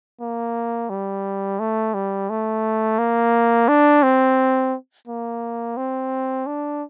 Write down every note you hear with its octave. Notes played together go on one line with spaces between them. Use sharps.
A#3
G3
A3
G3
A3
A#3
D4
C4
A#3
C4
D4